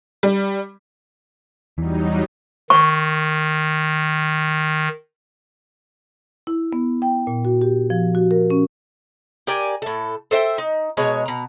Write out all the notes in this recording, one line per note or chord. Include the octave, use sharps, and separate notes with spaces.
G3
E2 E3 F#3 G3 D#4
D#3 C#6
E4
B3
G5
A#2
F#4
G4
F3
F#4
A#4
C#4
G4 A#4 D5 G#5
A2 A4
A4 C5 E5 G5
D#4
B2 G#3 C#5 A#5
B2 A#5